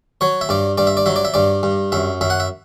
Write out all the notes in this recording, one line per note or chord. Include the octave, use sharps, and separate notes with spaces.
F#3 C#5
E5
G2 D5
G2 D5
E5
D5
F#3 E5
D5
E5
G2 D5
G2
F#2 E5
F#2 E5
F#5
E5